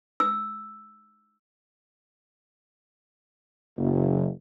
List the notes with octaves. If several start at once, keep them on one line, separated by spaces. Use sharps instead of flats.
E6
F#1